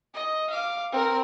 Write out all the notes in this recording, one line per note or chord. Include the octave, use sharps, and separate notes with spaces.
D#5
F5 D6
C4 A#4